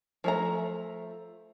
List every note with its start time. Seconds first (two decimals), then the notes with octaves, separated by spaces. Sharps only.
0.24 F3 A3 A#5